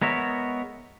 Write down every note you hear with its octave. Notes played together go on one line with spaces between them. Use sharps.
G#3 B3 A#4 C#5 E5